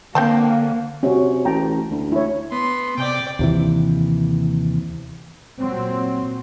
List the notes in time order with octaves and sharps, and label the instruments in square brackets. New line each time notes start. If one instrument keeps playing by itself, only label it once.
[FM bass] D3 [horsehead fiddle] A#3 [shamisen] C4 G5 A5
[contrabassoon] C3 [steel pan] C#4 F#4
[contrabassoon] A1 [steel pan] G5 A5 A#5
[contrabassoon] D2
[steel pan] E4 C#5
[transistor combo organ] B3 [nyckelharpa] C6
[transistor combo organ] C3 [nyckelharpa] D5 G5
[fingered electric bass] D#2 C3 E3
[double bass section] A#2 F#3 C4